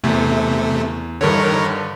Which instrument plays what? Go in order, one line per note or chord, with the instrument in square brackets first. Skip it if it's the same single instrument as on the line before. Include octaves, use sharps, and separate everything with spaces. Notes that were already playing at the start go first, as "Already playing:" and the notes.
[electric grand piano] E2 [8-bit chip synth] C3 A3
[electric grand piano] G2 D3 [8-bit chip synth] D#3 A#4 C#5